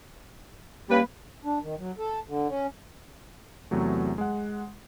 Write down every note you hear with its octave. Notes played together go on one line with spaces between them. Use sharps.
G3 A#3 C#4 B4
D4
D#3
F#3
A4
D3
C#4
E2 C3 F#3 A3
G#3 F#5